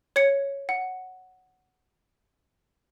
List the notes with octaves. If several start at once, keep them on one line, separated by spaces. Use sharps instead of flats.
C#5 G#6 C#7
F#5